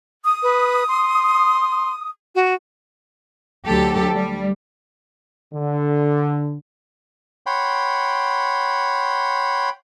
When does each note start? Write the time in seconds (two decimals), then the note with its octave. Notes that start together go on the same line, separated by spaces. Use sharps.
0.24 D#6
0.43 B4
0.88 C6
2.35 F#4
3.66 D2 F#3 G4 A4
4.15 G3
5.53 D3
7.46 C#5 F#5 G5 B5 C6